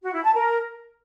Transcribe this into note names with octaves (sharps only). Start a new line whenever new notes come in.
F#4
E4
A5
A#4